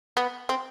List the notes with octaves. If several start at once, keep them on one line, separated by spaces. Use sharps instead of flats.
B3
C4